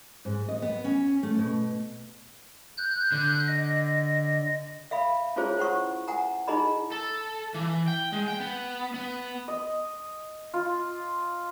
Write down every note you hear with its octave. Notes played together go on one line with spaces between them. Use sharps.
G#2
D#5
B3
C#4
A3
B2
F#6 G6
D3
D#5
E5 F5 B5
C#4 E4 F4 G#4 C5 C#5
E4 C5 F#5 C#6
F#5 G#5 A#5
D#4 E4 G#4 D#5 A#5 B5
A4
E3
G5
G#3
G5
B3
B3
D#5
F4